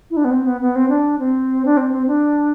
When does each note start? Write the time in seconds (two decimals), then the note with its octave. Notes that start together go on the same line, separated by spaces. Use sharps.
0.11 E4
0.17 D4
0.25 B3
0.31 C4
0.46 B3
0.61 B3
0.76 C4
0.89 D4
1.19 C4
1.65 D4
1.77 C4
1.93 C4
2.07 D4